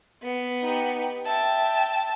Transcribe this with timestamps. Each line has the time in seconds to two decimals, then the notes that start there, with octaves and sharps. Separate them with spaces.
0.22 B3
0.63 D#4 G4
1.26 E5 G5 A5